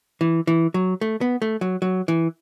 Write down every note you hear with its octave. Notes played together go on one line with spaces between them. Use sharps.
E3
E3
F#3
A3
B3
A3
F#3
F#3
E3